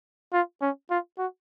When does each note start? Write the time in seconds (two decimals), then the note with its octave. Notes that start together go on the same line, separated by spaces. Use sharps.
0.33 F4
0.61 C#4
0.90 F4
1.18 F#4